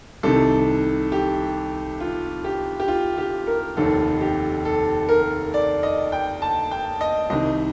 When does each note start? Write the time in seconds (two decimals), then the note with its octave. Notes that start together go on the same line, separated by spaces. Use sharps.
0.23 C2 C3 D#3 A4
1.12 G4
2.00 F4
2.44 G4
2.80 G4
2.88 F4
3.18 G4
3.47 A#4
3.77 F1 D#2 D#3 A4
4.21 G4
4.65 A4
5.09 A#4
5.54 D5
5.83 D#5
6.12 G5
6.42 A5
6.71 G5
7.01 D#5
7.30 C2 C3 D#3 D#5